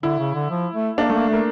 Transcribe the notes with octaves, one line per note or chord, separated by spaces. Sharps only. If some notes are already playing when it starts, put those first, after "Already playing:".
D3 E4
C#3
D3
F3
A3
A#3 D4
A3 A#3
A3 A#3